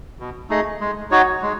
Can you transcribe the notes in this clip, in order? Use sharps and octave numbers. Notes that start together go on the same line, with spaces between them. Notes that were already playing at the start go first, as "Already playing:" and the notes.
B2
A3 D#4 G#4 D#5
G#3
D#4 F#4 C#5
G#3